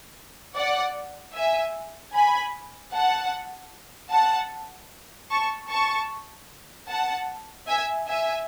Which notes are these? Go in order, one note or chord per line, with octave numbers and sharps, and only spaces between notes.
D5 F#5
E5 G#5
G#5 B5
F#5 A5
F#5 A5
A5 C#6
A5 C#6
F#5 A5
E5 G#5
E5 G#5